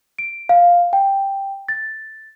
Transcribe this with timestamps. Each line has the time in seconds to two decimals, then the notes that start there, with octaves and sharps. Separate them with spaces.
0.19 D7
0.49 F5
0.93 G5
1.69 A6